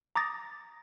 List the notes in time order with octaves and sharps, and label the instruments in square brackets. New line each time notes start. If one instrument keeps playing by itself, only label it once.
[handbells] A#5 D6 D#6 A6 A#6